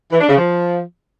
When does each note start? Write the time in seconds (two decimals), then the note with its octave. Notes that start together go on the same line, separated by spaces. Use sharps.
0.12 E3
0.21 D4
0.29 C#3
0.38 F3